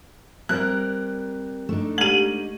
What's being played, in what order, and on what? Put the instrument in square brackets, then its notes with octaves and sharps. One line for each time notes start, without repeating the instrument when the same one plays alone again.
[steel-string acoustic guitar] G3 C4 A#4 [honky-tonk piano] F#6
[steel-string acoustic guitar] A3 D4 D#4
[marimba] G#3 G4 [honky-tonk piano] D#7 F#7